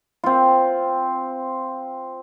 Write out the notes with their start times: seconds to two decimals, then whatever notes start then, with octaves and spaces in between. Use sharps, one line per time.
0.24 C4 F4